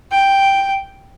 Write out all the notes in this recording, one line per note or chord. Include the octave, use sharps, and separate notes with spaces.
G5